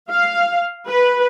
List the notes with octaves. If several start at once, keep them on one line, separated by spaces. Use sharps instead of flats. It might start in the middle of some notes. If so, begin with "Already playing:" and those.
F5
B4